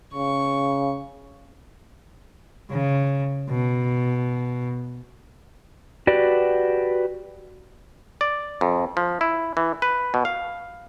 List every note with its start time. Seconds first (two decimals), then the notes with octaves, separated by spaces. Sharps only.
0.13 C#3 C#6
2.70 C#3
3.49 B2
6.07 F#4 G4 B4 D5
8.21 D5
8.61 F2
8.97 F3
9.21 E4
9.57 E3
9.82 B4
10.14 B2
10.25 F5